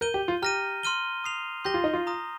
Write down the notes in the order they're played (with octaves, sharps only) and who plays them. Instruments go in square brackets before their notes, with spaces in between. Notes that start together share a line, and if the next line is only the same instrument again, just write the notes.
[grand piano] A#4 [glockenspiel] G6 D#7 G7
[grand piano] G4
F4
[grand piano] G4 [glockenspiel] A#5 F6 A#6 D#7
[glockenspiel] C6 F6 D#7 G7
D#6 C7 F7
[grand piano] G4 [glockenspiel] C6 G6 A#6 D#7 G7
[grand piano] F4
D#4
F4
[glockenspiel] A#5 D#6 A#6